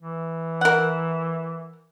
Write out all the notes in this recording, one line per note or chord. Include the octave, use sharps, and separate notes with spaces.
E3
A#4 F#5